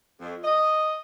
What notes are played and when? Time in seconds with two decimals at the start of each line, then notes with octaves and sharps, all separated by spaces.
0.21 F2
0.44 D#5